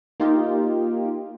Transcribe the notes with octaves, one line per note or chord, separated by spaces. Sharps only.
A#3 D#4 F4 G4